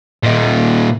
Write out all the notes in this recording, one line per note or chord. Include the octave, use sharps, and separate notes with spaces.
A#2 D#4